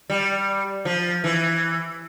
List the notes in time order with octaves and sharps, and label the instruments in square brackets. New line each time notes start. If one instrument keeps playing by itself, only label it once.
[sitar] G3
F3
E3